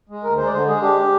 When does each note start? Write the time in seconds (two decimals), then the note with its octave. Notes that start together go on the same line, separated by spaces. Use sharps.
0.09 G#3
0.23 D2 A#4
0.38 G#3 C5
0.46 D5
0.53 D3 C5
0.68 G#3 G#4
0.82 D4 G4